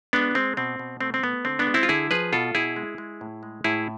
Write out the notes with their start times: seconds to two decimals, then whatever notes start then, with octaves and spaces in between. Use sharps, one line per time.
0.13 G#3 B3 D4
0.35 G#3 C4
0.57 B2 C4
0.79 B2
1.01 A3 C4
1.14 C4
1.23 A3 B3
1.45 D3 C4
1.59 B3 D4
1.67 G#3
1.74 C4 E4
1.83 F4
1.89 D3 E4 G#4
2.11 F3 G#4 B4
2.33 B2 F4 A4
2.55 B2 E4 G#4
2.76 G#3
2.98 G#3
3.21 A2
3.43 G#3
3.64 A2 E4 G#4